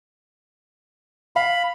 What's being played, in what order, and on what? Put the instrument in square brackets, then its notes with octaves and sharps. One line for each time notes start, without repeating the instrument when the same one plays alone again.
[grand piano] F5 [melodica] B5